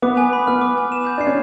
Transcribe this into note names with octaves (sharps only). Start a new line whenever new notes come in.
B3 D6
G#5
B5
B3 F6
D6
G#5
E7
G6
D4 C7
C#4